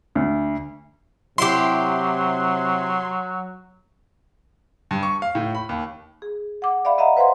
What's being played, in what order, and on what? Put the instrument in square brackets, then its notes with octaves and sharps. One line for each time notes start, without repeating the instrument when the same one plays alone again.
[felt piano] D2
[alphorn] C3 [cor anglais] F#3 [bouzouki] E4 G4 [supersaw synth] C6
[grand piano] G2
C#6
F5
A2
B5
D#2
[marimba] G#4
F#5 D6
D5 E5 F5 B5
D#5 E5 F#5 A#5
B4 C5 F5 F#5 C6